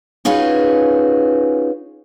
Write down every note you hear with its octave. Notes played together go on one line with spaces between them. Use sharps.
C#4 D#4 F4 F#4 G#4 B4